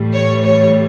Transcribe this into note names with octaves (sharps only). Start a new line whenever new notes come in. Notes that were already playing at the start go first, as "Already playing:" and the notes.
Already playing: A2 E3 G3
C#5
C#5